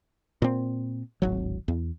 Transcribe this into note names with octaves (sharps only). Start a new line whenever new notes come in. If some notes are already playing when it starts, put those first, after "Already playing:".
A#2 C4
D1 G#1 F#3
E2